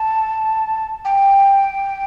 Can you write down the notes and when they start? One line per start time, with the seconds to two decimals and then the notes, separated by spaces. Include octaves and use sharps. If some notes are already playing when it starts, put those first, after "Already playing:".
Already playing: A5
1.05 G5